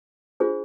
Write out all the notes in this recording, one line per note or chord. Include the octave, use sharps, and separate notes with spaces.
D4 F4 G#4 C5